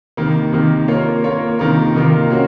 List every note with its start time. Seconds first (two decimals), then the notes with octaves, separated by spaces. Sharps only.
0.17 C3 D#3 A#3
0.53 C3 D#3 A#3
0.88 A#3 F4 A#4 C#5
1.24 A#3 F4 A#4 C#5
1.59 C3 D#3 A#3 F4 A#4
1.94 C3 D#3 A#3 F4 A#4
2.30 A#3 C#4 F#4